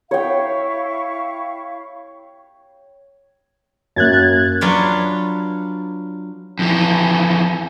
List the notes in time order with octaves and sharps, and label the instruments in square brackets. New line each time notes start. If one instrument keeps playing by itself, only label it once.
[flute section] E4 F5 C#6 [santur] C#5 G5
[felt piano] F#2 A#3 [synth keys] F#6 G#6 A6
[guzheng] F#3 D4 F4 B4 C#5 D5
[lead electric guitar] F2 E3